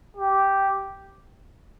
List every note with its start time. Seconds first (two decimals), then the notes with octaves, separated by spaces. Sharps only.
0.17 G4